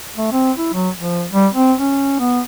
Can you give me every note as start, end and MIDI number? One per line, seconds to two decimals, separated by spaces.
0.18 0.30 57
0.32 0.52 60
0.58 0.71 64
0.73 0.90 54
0.97 1.25 53
1.32 1.48 55
1.53 1.74 60
1.80 2.16 61
2.19 2.41 59